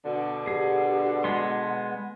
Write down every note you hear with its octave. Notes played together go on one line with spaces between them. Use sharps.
B2 D3
G4 G#4
F#5
G#3 B3 C6